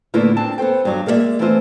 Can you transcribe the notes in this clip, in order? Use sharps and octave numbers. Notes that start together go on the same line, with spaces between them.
A2 D3 A#3 B3 E4 F4
C4 D4 A5
B3 A4 C5 G5
G2 F#3
G#3 A#3 F4 F#4 D5 E5
E3 A3 B3 C4 F4 C5